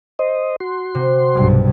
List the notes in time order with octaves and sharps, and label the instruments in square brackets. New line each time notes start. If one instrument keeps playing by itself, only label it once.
[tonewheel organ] C5 D#5
F#4 C6
[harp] C3
[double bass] B1 G2